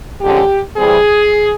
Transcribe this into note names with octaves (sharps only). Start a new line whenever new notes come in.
F2 D3 F3 G#3 C#4 G4
C3 E3 G3 C4 G#4